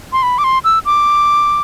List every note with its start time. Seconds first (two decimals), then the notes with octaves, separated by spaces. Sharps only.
0.13 C6
0.23 B5
0.38 D6
0.44 C6
0.64 E6
0.85 D6